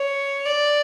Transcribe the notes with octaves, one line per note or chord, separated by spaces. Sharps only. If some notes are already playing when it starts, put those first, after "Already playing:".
Already playing: C#5
D5